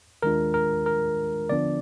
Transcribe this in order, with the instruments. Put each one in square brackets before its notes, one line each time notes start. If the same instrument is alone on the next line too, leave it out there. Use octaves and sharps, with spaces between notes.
[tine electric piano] D#2 D#3 G#3 D4 F4 A#4
A#4
A#4
D3 F3 B3 D4 F4 D5